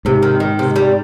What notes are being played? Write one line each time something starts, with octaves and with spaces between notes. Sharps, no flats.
G#2 C3
D#3
D#3
C3
G3